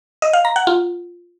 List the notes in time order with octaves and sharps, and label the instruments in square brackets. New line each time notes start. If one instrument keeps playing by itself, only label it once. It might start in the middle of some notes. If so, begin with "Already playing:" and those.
[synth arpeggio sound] D#5
F5
A#5
F#5
F4